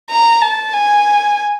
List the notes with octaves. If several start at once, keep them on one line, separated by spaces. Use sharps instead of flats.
A#5
A5
G#5